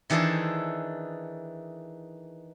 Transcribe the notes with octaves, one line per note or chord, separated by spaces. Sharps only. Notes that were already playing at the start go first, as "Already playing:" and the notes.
D#3 E3 D4 G#4 A4 C5